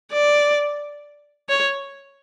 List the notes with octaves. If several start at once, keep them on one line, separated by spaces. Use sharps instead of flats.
D5
C#5